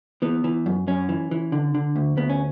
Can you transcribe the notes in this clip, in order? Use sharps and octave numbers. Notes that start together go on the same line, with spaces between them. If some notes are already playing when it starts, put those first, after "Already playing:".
E3 B3
E3
F#2
F#2 C#4
E3
E3
D3
D3
D2
D2 B3
C#4